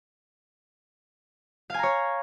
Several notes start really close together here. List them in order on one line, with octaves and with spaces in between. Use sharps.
F5 G#5 A#5 C#5